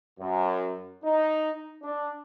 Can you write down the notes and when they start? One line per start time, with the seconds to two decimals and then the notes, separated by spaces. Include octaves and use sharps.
0.19 F#2
1.04 D#4
1.82 D4